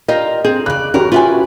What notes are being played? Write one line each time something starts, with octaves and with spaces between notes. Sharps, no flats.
F4 G4 A#4 D#5
C4 G#4
C#3 D5 F#6
E2 C#4 F#4 G4 A#4
F4 B4 E5 G#5